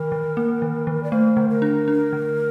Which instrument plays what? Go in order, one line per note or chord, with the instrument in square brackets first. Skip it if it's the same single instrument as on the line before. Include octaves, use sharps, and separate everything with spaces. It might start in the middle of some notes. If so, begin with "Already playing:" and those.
Already playing: [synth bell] D#3 [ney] A#4
[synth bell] D#3
A#3
D#3
D#3
[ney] D5
[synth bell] A3 [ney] C5
[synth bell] D3
[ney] A#4
[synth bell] D4
D4
D3